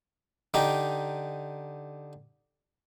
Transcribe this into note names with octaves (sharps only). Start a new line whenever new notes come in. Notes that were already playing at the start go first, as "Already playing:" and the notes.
D3 D#4 G4